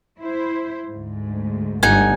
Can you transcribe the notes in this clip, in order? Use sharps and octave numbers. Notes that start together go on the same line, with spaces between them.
E4 C5
D2 G#2
G1 D#4 F#5 G#5